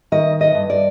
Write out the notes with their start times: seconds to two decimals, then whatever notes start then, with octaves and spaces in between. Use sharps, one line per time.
0.12 D#3 D#5
0.41 D#5
0.55 G2
0.70 D5